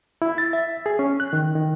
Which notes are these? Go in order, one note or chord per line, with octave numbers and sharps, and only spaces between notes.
E4
A6
E5
G#4
C#4
F#6
D#3
D#3